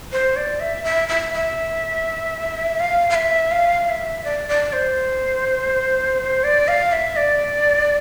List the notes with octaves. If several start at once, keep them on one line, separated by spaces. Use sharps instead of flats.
C5
D5
E5
E5
E5
E5
F5
F5
E5
F5
E5
D5
D5
C5
D5
F5
E5
D5